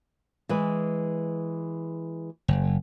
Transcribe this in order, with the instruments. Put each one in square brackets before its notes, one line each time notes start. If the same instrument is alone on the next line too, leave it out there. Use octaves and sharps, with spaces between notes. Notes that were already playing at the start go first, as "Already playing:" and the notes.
[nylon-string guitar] E3 G#3 B4
[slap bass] F#1